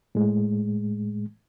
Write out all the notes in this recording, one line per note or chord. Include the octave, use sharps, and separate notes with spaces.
A2 G#3